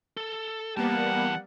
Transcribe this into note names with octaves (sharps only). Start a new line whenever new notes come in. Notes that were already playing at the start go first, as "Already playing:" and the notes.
A4
E2 G3 A#3 B3 F#5 A5